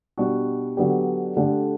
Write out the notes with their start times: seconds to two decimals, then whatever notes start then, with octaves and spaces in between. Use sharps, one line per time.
0.18 B2 G3 D4 F#4
0.77 D3 F#3 B3 D4 G4
1.37 D3 A3 D4 G4